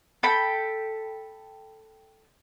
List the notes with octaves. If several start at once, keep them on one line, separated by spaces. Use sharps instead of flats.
A4 G5 B5